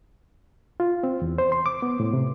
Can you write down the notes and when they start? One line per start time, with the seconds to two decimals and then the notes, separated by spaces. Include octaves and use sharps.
0.80 F4
1.03 C4
1.22 E2
1.38 C5
1.52 C6
1.66 D6
1.82 B3
2.00 A2
2.13 C3